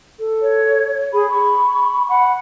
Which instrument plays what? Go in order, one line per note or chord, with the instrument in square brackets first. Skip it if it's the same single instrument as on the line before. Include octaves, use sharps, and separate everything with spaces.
[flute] A4
[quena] C#5
[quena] G#4 [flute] B5
[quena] C#6
[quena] F#5 [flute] B5